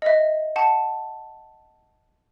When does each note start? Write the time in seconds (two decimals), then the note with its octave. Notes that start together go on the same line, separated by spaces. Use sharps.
0.02 D#5 E5
0.56 F#5 A5